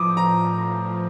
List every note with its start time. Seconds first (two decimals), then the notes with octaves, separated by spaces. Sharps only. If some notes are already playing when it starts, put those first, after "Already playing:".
Already playing: A2 F3 D6 D#6
0.17 A#5
0.58 A#5